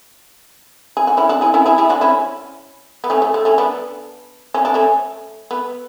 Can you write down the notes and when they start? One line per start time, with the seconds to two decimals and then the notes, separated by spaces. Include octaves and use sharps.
0.97 G#4
1.07 F#4
1.17 C#4 E4
1.29 D4 F#4
1.41 E4 G#4
1.54 C#4 E4
1.66 E4 G#4
1.78 E4 G#4
1.89 D4 F#4
2.01 C#4 E4
3.04 B3
3.10 A3 C#4
3.22 A3
3.34 A3
3.45 A3 C#4
3.58 B3 D4
4.54 C#4
4.65 D4
4.74 A3 C#4
5.51 B3